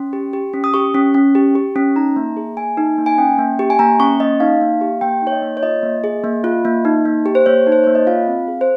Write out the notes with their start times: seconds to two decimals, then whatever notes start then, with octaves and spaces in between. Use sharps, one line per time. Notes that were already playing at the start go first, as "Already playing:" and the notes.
Already playing: C#4 C6
0.13 G4
0.33 G4
0.53 C#4
0.64 D#6
0.74 G4 C#6
0.94 C#4
1.14 C#4
1.35 G4
1.55 G4
1.76 C#4
1.96 D#4 A#5
2.16 A#3
2.37 G#4
2.57 A#3 G#5
2.77 D#4
2.98 A#3
3.06 G#5
3.18 C#4 G5
3.39 A#3
3.59 G4
3.70 G#5
3.79 A#3 A#5
4.00 C#4 C#6
4.20 A#3 D#5
4.40 D#4 F5
4.61 A#3
4.81 G4
5.01 A#3 G5
5.22 D#4
5.27 C#5
5.32 D#5
5.42 A#3
5.57 C#5
5.63 F4 D#5
5.83 A#3
6.04 G#4
6.24 A#3
6.44 F4
6.65 A#3
6.85 D#4
7.05 A#3
7.26 G4
7.35 C5
7.46 A#3 C#5
7.67 D#4
7.72 C5
7.84 A#3 C#5
7.95 D#5
8.07 F4 F5
8.27 C4
8.48 G#4
8.61 C5